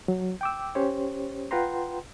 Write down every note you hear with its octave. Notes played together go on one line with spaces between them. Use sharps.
F#3
G5 D6 E6
C#4 G4 C5 C#5
F4 B4 F#5 G5 A#5 C6